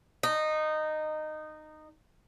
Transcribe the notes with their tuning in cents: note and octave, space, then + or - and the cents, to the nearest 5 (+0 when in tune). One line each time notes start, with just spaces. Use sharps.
D#4 -15